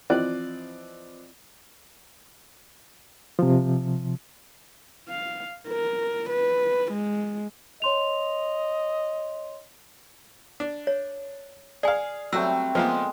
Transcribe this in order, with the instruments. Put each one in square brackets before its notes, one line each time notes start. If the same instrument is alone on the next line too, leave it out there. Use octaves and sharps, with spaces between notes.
[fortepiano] E3 F3 C4 D5 D#5 F#6
[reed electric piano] C3 F3
[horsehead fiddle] F5
A#4
B4
G#3
[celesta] C#5 C6 F7 [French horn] D#5
[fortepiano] D4
[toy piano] C#5
[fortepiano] G#4 F5 [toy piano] D5 G#5
[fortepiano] F#3 [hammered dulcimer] G3 A3 C4 [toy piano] E6
[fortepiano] F3 A#3 B3 [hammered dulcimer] G#3